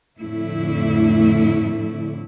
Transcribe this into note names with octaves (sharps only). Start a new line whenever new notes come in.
F2 A2 D3 A3 E4